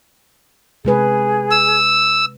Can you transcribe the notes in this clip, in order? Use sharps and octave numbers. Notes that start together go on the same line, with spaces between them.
C3 G#3 G#4 B4
E6